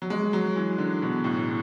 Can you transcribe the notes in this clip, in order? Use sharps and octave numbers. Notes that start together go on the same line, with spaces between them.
F#3
G#3
F#3
E3
D3
B2
A2